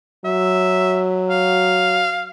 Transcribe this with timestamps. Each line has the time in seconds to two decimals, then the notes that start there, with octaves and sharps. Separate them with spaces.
0.25 F#3 E5
1.30 F5